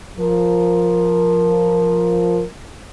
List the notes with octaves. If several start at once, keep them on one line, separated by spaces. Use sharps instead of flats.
F3 A#4